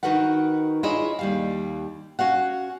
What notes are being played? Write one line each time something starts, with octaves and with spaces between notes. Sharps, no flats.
D#3 D#4 F#4 A#4 B4 F#5
E4 F4 G#4 C#5 D#5 E5
D#2 G3 F5
C#4 F#4 F5 F#5